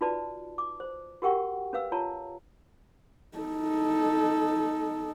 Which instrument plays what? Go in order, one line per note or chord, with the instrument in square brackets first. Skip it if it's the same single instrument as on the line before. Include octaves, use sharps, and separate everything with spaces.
[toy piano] D#4 F4 F#4 B4 D5 A5
D6
C5
F#4 G4 A#4 F#5 G5 C#6
C#4 B4 F5 E6
F4 C#5 A5 A#5
[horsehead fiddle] D#4 A4